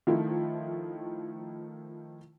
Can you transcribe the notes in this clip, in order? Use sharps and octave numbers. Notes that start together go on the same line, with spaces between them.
D#3 F3 A3 E4 F4